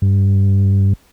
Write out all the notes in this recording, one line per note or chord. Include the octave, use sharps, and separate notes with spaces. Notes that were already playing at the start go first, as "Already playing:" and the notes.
G2